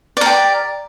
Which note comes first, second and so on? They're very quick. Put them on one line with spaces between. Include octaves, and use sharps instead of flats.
D5 A#4 G4